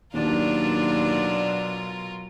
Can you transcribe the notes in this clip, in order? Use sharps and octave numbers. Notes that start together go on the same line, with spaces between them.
D#2 B2 F#3 D4 F4 A#4